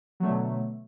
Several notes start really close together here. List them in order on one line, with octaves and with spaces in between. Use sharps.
F#3 A3 D3 B2